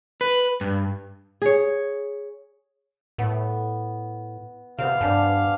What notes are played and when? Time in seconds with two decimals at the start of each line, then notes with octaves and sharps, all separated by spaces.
0.21 B4
0.61 G2
1.42 G#4 C#5
3.18 A2 B3
4.79 C3 B3 C5 D5 F5
5.01 G2 D4 G#5 A5